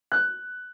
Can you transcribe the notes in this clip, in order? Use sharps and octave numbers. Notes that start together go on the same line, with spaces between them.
F#6